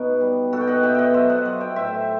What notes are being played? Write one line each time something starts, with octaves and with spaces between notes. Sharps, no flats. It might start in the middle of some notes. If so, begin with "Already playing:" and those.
Already playing: B2 B3 D#4
G3
B2 F#4 A4
G5
D#5 F#5
B2 E5 G5
D#5 F#5 G5
F#3 C5 E5
D#5 F#5
F#3
E5 G5
A2 C5 E5